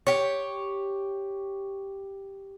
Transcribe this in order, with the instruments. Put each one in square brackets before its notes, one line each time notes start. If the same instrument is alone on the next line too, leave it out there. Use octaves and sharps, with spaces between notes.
[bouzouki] G4 C#5